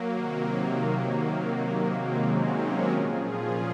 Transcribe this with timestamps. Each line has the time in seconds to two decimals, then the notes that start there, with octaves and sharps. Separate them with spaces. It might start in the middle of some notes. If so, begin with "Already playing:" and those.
Already playing: F#3 A#3
0.09 C3 D#3
1.02 C3 D#3
1.96 C3 D#3 G#3 C4
2.27 A#3 C#4
2.58 F#4 A#4
2.89 A#2 F3 F4 G#4
3.36 C#4 F4